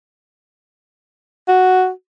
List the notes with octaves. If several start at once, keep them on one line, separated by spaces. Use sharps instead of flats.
F#4